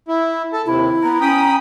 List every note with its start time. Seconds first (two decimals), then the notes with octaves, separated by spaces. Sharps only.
0.08 E4
0.53 A4 A5
0.66 D#2 C3 E4
1.03 B3 A#5
1.21 C#4 G5 B5 D#6